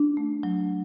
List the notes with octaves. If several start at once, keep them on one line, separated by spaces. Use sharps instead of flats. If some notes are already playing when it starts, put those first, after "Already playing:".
Already playing: D4
A3
F#3